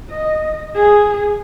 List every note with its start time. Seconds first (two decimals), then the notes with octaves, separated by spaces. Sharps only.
0.11 D#5
0.75 G#4